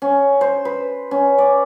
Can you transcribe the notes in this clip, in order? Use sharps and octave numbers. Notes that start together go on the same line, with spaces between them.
C#4
C5
B4
C#4
D5